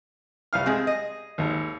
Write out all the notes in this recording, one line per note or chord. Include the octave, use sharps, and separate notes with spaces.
C2 F5 F6
G#3 A3 C4 G#4
D#5
G#1 D#2